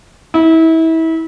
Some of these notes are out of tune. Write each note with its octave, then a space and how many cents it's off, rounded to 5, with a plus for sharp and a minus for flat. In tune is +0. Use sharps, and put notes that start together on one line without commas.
E4 -30